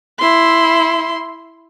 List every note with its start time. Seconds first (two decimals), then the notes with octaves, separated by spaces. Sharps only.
0.19 E4 C6